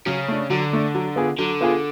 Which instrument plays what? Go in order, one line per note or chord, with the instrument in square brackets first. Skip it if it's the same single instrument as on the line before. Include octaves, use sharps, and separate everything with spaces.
[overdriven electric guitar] C#3 [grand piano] F#3
[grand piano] A3 D4
[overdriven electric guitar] D3 [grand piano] F#3
[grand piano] A3 D4
F#3
B3 F4 G#4
[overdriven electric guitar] D3 [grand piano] F#3
[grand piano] B3 F4 G#4